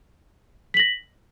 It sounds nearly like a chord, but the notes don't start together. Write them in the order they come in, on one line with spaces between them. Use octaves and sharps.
B6 F#7 A#6